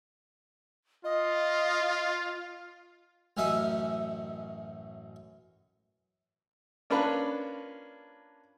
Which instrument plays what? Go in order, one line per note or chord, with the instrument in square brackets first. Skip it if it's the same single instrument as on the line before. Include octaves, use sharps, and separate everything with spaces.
[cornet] F4 [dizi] D#5
[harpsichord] A1 F#2 C#4 D#4 E5 D#6
[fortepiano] A#3 C#4 D4 F4 B4